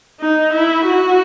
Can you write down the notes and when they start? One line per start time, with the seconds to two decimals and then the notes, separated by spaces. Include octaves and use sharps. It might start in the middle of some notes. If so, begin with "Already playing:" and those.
0.21 D#4
0.53 E4
0.85 F#4